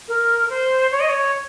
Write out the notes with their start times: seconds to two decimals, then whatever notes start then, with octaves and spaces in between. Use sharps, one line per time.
0.08 A#4
0.49 C5
0.91 C#5
1.00 D#5
1.09 C#5